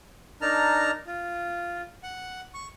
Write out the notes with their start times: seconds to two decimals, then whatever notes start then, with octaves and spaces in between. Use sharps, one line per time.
0.42 D4 D#4 A#4 A5 A#5 F6
1.07 F4
2.03 F#5
2.54 C#6